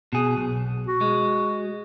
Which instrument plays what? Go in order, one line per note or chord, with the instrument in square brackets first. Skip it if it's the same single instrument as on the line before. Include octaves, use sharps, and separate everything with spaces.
[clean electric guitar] B2 G#4
B1
[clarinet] F#4
[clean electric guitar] G#3